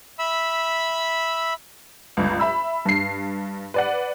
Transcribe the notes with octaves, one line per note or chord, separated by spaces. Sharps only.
E5 B5 E6
G1 C#2
E5 B5 E6
G2 C7
B4 D5 F#5